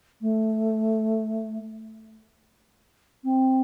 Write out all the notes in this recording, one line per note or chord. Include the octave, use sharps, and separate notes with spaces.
A3
C4